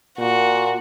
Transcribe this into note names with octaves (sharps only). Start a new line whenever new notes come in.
A#2 F#4